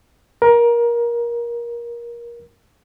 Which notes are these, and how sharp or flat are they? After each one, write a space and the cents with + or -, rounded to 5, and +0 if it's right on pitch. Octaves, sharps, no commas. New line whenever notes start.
A#4 +20